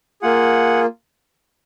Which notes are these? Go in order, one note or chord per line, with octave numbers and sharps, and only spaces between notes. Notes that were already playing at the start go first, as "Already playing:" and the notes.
A#3 F4 G#4 F#5